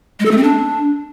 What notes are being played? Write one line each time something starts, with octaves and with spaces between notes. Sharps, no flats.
G#3
A4
A3
C4
D4